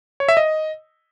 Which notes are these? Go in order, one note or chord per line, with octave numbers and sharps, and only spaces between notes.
C#5
E5
D#5